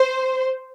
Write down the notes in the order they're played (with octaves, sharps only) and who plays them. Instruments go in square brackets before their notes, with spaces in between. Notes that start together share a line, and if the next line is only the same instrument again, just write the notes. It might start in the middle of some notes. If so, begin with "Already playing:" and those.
Already playing: [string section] C5